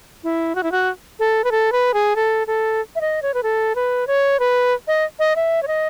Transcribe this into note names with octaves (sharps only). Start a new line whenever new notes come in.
E4
F#4
E4
F#4
A4
B4
A4
B4
G#4
A4
A4
E5
D#5
C#5
B4
A4
B4
C#5
B4
D#5
D#5
E5
C#5
D#5